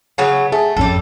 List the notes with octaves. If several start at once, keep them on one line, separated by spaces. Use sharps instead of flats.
C#3 F#3 B3
A3 G#4
A1 F2 G3 C#4 A4